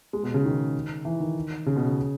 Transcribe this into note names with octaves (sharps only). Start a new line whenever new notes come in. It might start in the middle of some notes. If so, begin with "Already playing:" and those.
G#3
B2
C#3
D#3
E3
D#3
C#3
B2
C#3